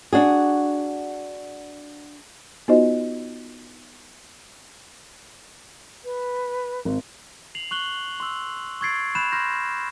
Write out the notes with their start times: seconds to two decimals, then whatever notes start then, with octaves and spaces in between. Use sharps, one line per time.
0.13 D4 F#4 G#4
2.68 B3 D#4 F4 F#4 C5 D#5
6.04 B4
6.85 G#1
7.55 C7 F7 F#7
7.71 C#6 F#6 F#7 G7
8.20 C6 E6
8.81 C#6 E6 G#6 A6 C7 D7
9.15 B5 F#6 G6 E7
9.32 C6 F6 G6 A#6